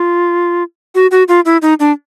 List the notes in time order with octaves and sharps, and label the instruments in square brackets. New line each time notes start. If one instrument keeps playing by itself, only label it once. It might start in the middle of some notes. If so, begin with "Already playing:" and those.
Already playing: [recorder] F4
F#4
F#4
F4
E4
D#4
D4